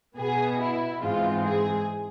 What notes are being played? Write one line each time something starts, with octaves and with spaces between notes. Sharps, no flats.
B2 B3 G#4
E4
G#2 E3 G#3 C4 F4
G#4